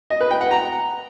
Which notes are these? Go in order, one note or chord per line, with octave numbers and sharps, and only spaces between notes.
D#5
B4
G5
F#5
A#5